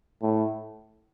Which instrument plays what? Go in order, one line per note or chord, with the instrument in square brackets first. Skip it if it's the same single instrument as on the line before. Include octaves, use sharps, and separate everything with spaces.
[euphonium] A2